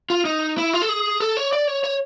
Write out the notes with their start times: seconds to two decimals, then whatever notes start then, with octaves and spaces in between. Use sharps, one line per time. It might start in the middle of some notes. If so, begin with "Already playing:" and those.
0.10 F4
0.25 D#4
0.58 E4
0.73 F4
0.82 A4
0.89 G#4
1.20 A4
1.37 C#5
1.53 D5
1.68 C#5
1.84 C#5